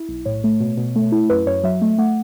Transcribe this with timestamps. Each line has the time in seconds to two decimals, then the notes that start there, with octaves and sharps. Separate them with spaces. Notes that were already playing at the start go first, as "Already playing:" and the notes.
Already playing: E4
0.09 B1
0.25 A2 C#5
0.44 A3
0.60 B2
0.77 B2
0.96 A3
1.12 E4
1.30 F#2 B4
1.46 F#2 C#5
1.63 F#3 E5
1.82 A3
1.98 A3 F#5